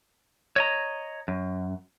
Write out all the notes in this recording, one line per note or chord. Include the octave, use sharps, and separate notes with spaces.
C#5 D#5 A#5
F#2